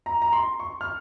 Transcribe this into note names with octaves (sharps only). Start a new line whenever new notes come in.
A#5
A#5
C6
C#6
F6